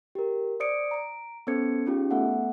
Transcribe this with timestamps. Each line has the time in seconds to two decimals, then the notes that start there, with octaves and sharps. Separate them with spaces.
0.15 G4 A#4
0.60 C5 D5 D#6 C#7 D7
0.91 A#5 D7
1.47 B3 C#4 A4 C5 G#6 C#7
1.86 C#4 D#4 F4 G4 G#4
2.11 A3 B3 A4 E5 F#5